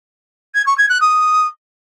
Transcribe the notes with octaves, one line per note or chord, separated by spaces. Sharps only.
G#6
C#6
G#6
F#6
D#6